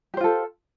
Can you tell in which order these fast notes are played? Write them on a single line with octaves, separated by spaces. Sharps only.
G4 C5 F4 A4